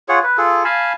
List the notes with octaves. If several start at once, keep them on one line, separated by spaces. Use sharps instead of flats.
F4 G#4 C#5 F#5
B4
F4 G#4 A4
F5 G#5 A5 B5